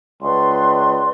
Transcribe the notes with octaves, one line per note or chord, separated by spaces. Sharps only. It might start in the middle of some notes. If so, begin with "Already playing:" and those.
C#2 B4 D5 C6